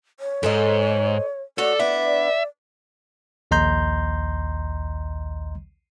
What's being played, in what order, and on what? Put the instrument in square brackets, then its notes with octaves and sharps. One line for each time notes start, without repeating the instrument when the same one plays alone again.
[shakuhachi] C#5
[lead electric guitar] F2 G#2 [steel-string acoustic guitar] A4 C5 D#5
[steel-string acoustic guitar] A3 F#4 C#5 [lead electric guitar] A4 [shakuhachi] D5
[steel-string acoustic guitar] B3 D4 E4 [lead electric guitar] E5
[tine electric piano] A#1 D#2 D#5 A#5 C6 G6